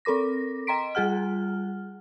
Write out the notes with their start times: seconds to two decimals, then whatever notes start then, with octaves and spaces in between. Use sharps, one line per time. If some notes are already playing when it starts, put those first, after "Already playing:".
0.05 C4 A4 A#4 D6 A#6
0.67 D#5 G5 A#5 C6 B6 D7
0.95 G3 F4 G#4 F#5 F6